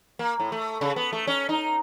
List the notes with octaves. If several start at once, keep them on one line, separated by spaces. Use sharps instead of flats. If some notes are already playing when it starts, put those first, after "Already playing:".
A#3
A2
A3
C#3
B3
A3
C#4
D#4